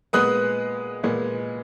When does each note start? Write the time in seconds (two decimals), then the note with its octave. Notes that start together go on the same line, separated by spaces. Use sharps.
0.13 A#2 G#3 B3 D#6 F#6
1.03 A#2 G#3 B3